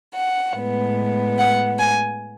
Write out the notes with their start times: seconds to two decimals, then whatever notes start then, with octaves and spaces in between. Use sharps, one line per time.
0.13 F#5
0.55 A2 G#3 B3
1.37 F#5
1.78 G#5